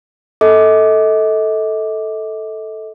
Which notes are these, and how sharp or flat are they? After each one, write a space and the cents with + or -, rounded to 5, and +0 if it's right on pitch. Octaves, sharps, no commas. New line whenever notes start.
A4 +0 D#5 +40 D6 +0